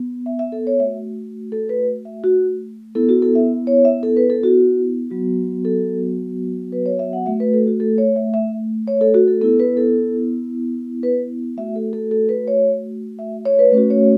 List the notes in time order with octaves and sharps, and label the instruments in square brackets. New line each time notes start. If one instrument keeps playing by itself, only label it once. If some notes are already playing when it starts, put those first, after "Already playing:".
Already playing: [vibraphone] B3
E5
E5
A4
C#5
A3 F#4 E5
A4
B4
E5
F#4
B3 E4 A4
F#4
A4
E5
C#5
E5
A4
B4
A4
F#4
F#3 B3 F#4
A4
B4
C#5
E5
F#5
A3 F#4 E5
B4
A4
F#4
A4
C#5
E5
E5
C#5
A4
F#4
A4
B3 E4 A4
B4
A4
B4
A3 F#4 E5
A4
A4
A4
B4
C#5
E5
C#5
B4
A3 C#4 F#4 B4
C#5